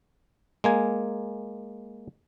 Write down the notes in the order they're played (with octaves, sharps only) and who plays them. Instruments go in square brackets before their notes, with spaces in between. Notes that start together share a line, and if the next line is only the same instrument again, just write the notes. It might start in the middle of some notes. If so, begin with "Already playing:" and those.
[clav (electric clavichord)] G#3 A#3 G#5